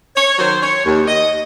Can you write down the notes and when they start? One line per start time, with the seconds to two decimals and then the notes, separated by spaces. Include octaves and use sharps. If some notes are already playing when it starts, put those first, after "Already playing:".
0.15 C#5
0.38 D#3 F#3 C5
0.62 C#5
0.85 D#2
1.08 D#5